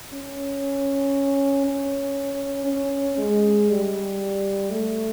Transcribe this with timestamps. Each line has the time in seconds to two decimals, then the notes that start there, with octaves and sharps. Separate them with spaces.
0.13 C#4
1.66 C#4
2.67 C#4
3.18 G#3
3.69 G3
4.70 A3